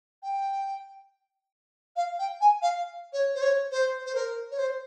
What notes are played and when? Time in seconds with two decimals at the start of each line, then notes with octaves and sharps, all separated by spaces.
0.23 G5
1.96 F5
2.19 G5
2.41 G#5
2.62 F5
3.13 C#5
3.35 C5
3.41 C#5
3.71 C5
4.06 C5
4.15 A#4
4.51 C#5
4.58 C5